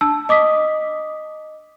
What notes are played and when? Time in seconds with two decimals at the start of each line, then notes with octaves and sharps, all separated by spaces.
0.01 D4 A5 E6
0.29 D#5 D6 D#6 B6